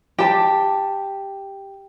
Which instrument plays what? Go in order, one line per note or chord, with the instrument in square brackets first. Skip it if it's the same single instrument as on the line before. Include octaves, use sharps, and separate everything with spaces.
[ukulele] G4 A5